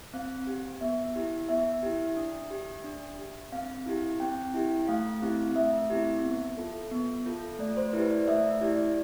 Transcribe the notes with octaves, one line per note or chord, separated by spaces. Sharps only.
C4 F5
G4
B3 E5
E4 G4
B3 E5
E4 G4
D4
G4
D4
G4
C4 F5
E4 G4
C4 G5
E4 G4
A3 F5
C4 E4 G4
A3 E5
C4 E4 G4
B3
F4 A4
B3
F4 A4
A3 D5
C5
E4 G4 B4
D5
A3 E5
E4 G4 D5